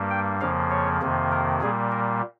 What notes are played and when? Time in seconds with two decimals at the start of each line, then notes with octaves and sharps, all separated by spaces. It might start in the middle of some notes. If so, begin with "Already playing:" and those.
Already playing: G2 G3 A#3
0.10 G5
0.41 F2 C#3 F3 A#3 F5
0.70 C#5
1.01 F2 C3 D#3 A#3
1.31 A#4
1.61 A#2 G3 A#3 G#4
1.91 A#4